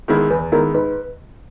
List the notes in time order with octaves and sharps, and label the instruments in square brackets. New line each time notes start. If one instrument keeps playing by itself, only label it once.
[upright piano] D#3 G#3 B3 E4
[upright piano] E2 [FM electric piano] B4
[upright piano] D#3 G#3 B3 E4 [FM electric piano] A#4
[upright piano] G#2 [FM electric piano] B4